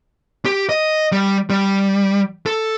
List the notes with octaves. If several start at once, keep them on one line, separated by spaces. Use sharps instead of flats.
G4
D#5
G3
G3
A4